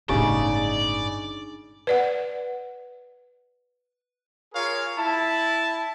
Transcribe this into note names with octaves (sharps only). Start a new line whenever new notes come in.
G1 A2 C#3 D4 D#4 G#4 D5
B4 D5 F#5
F4 G#4 A#4 C#5 F5
E4 A5